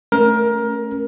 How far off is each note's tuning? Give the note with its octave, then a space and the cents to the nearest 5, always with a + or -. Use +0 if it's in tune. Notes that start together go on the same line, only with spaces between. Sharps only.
A3 +0 C#4 -10 A#4 +20